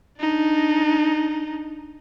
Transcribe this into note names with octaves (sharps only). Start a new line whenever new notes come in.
D4 D#4